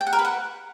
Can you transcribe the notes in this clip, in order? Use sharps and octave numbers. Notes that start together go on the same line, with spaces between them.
G5
F#5
A#4
B4
F#5